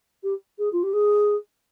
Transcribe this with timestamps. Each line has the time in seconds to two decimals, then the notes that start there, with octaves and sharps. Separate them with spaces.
0.23 G4
0.58 G#4
0.72 F4
0.83 G4
0.93 G#4